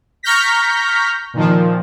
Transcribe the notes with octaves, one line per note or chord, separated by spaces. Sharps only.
A#5 C#6 F6 G6 A#6 B6
A#2 D#3 F3